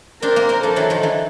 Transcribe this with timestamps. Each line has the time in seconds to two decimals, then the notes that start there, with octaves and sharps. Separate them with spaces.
0.22 C4 D4 A#4
0.36 A#3 C4
0.49 A#3 C4
0.63 F3 G3 A4
0.76 E3 F#3
0.90 D#3 F3
1.03 D3 E3